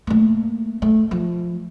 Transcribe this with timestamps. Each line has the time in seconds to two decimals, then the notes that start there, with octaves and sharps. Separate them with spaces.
0.07 A3 A#3
0.82 A3
1.11 F3